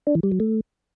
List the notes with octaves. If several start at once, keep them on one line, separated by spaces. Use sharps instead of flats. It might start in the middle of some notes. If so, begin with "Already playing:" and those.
D4
E3
G3
F#3
A3